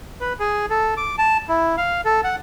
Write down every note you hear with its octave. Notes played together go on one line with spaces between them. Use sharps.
B4
G#4
A4
D6
A5
E4
F5
A4
F#5